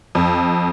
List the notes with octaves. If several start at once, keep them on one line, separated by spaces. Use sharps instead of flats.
F2